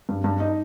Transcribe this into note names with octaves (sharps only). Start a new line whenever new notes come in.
G2
G2
D#4